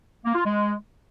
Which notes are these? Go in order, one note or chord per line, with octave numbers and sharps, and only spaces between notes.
A#3
F4
G#3